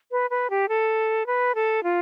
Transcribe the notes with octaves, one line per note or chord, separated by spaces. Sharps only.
B4
B4
G4
A4
B4
A4
F4